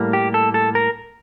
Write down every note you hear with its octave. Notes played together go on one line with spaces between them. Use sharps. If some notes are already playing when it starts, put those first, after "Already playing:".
Already playing: A2 G3 A#3
G4
A4
A4
A#4